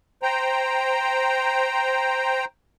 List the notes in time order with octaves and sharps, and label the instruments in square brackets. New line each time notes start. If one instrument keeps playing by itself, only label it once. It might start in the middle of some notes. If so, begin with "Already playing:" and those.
[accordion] C5 G5 A#5